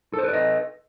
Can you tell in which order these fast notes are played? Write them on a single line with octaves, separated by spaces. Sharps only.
A4 C5 B4 D5 D#5